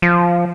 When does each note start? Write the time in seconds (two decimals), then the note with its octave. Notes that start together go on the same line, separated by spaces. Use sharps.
0.02 F3